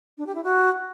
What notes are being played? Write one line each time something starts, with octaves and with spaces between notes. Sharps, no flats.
D4
G4
E4
F#4